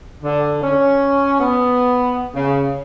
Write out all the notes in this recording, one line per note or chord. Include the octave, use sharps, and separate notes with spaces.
D3
C#4
B3
C#3